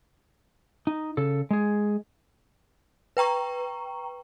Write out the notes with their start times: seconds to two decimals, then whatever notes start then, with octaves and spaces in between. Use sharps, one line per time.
0.87 D#4
1.17 C#3 A4
1.51 G#3 G#4
3.17 B4 G5 A#5 C#6